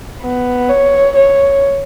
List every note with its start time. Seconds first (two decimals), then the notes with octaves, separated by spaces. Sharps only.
0.23 B3
0.70 C#5
1.17 C#5